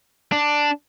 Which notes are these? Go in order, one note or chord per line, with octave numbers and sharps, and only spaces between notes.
D4